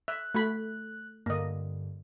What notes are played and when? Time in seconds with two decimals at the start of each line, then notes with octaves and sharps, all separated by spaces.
0.08 E5 F#6
0.34 A3 F#4 B5
1.26 G2 D3 A#3 D#5